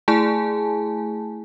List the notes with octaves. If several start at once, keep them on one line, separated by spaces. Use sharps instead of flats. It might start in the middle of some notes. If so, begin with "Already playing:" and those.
A3 E4 G#4 G#5 A5